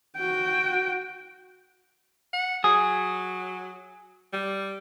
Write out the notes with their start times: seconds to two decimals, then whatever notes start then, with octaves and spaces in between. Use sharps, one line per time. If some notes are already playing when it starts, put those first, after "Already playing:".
0.17 F#4 G5
2.33 F#5
2.64 F#3 G#4
4.33 G3